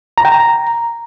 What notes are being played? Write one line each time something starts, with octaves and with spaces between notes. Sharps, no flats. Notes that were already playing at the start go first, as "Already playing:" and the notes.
A#5
G5
A#5